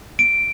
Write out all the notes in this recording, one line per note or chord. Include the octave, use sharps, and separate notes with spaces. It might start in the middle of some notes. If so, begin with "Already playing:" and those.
D7